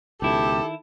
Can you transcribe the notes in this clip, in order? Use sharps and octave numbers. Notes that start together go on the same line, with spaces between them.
C#2 B2 D#3 E4 G4 A4